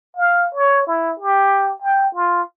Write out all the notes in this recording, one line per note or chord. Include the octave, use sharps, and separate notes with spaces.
F5
C#5
E4
G4
G5
F4